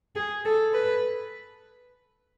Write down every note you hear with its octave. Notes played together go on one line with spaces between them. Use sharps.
G#4
A4
B4